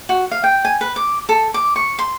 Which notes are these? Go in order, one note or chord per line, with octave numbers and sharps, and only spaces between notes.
F#4
F5
G5
G#5
B4
D6
A4
D6
C#6
C6